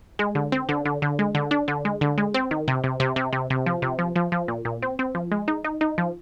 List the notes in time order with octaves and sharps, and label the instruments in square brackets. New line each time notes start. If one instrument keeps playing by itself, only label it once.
[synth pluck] G#3
D3
C4
D3
D3
D3
G#3
D3
D4
D3
G#3
D3
G#3
C4
D#3
C3
C3
C3
C3
C3
C3
F3
C3
F3
F3
F3
A#2
A#2
C4
C4
F3
G#3
D#4
D#4
D#4
F3